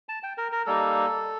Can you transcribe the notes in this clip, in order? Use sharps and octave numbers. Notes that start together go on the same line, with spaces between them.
A5
G5
A#4
A#4
G3 A#3 D#4 A4